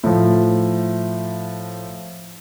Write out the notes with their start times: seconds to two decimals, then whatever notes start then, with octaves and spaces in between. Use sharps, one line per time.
0.04 A2 F3